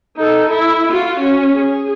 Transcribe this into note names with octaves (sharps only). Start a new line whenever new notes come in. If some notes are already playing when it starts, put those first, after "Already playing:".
D#4 A4
E4
F4 F#4
C#4
G#4